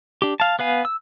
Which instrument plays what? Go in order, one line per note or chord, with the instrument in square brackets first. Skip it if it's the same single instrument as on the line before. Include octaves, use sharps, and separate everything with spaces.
[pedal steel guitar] D4 G4
F5 A5
B3 B4 F5 G#5
E6